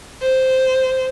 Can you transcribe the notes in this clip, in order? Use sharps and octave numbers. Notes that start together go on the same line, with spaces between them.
C5